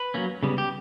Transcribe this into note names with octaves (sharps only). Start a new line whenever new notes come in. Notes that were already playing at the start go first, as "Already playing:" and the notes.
Already playing: B4
F#3 A#3 C#4
C#3 G3 B3
G4